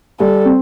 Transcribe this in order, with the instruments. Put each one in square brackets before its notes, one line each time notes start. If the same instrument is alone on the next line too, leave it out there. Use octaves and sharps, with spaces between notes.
[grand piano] G3 [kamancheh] A4
[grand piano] C4